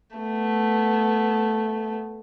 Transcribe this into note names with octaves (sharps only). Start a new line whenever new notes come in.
A3 B3